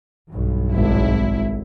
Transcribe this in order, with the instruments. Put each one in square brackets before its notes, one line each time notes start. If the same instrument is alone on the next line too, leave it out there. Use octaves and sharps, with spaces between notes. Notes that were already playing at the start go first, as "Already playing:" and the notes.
[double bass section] B1 G2
[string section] G#1 E4